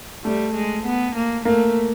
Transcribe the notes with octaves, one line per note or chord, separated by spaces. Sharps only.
G3 A3
G#3
B3
A#3
A3 A#3